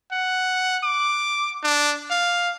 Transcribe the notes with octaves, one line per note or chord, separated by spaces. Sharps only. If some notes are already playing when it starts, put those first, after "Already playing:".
F#5
D6
D4
F5